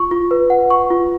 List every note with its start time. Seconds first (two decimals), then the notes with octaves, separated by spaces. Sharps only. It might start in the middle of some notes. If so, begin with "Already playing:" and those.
Already playing: F4 C#6
0.11 F4
0.31 B4
0.50 F#5
0.70 C#6
0.90 F4